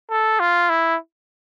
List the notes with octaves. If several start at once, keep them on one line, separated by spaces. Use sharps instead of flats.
A4
F4
E4